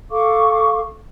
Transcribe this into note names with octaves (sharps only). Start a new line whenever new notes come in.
A4 F5 C#6 D6